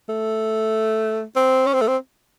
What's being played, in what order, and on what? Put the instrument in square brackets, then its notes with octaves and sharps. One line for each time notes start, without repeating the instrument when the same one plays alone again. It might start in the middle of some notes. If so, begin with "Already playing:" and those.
[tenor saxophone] A3
C4
C#4
C4
A3
C4